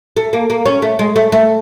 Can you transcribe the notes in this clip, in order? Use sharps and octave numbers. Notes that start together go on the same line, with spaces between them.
A3
A#3
A#3
C#4
A3
G#3
A3
A3